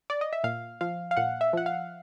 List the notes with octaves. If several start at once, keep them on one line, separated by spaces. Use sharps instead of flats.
D5
D#5
E5
A#2 F5
F3 F5
F5
A#2 F#5
E5
F3 F#5
F5